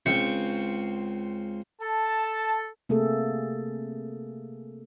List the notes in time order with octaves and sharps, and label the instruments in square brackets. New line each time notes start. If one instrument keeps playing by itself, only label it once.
[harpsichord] C#2 C4 G5 C#6
[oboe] A4 [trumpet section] A5
[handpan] C3 A3 A#3 G#4 A4